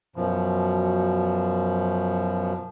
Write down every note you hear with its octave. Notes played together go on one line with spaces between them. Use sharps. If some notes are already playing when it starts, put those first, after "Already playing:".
F#2 B2 F3